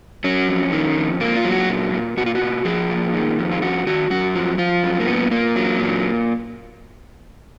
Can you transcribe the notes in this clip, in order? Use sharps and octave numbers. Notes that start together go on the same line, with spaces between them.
F#3 C#4
F2
D#3
F2
A#2 A#3
F4
F#3
F#4
A#2
A#2
A#2 F#4
F4
F#4
A#2
F3 G#4
A#2
D#3
F2
F4
F2 F#4
D#3 F#4
F#2 F#4
F3
F3 F4
F#2
A#3
A#2 B3
A#2 A#3
F#3
A#2